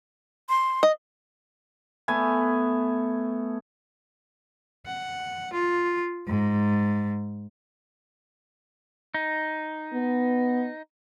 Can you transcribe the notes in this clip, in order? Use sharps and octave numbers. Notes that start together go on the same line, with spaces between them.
C6
D#5
A3 B3 G#5
F#5
F4
G#2
D#4
B3